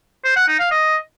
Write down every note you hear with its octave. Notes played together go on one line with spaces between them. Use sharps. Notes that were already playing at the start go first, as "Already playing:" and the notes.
C5
F#5
D#4
F5
D#5